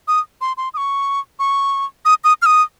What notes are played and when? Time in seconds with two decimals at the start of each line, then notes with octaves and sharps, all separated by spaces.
0.08 D#6
0.41 C6
0.57 C6
0.74 D#6
0.77 C#6
1.39 C#6
2.05 D#6
2.24 D#6
2.42 F6
2.46 D#6